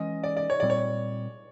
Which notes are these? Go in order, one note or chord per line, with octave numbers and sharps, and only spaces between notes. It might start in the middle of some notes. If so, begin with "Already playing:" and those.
Already playing: E3 G#3 C#4 D#5
D5
D5
C#5
A#2 G3 C4 D5
C#5